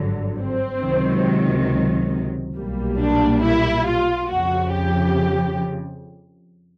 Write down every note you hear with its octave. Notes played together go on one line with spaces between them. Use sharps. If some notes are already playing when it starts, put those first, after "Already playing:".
Already playing: G#1 G2 D3 F#3
C4
C#2 C3 D#3 F#3
B1 A#2 G3 A#3
D4
E4
F4
F2 C#3 F3 F#4
G4